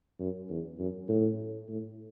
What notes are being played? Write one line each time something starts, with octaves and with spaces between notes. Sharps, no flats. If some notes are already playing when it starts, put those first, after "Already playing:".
F#2
E2
F#2
A2
A2